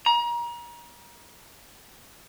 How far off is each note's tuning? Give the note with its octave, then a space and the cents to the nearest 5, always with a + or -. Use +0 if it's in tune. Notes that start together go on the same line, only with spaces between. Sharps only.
A#5 +30